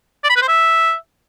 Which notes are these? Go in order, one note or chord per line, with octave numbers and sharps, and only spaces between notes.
D5
B5
B4
C5
E5